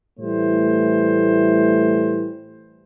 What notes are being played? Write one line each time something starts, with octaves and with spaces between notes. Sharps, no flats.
A2 E3 G3 A3 C5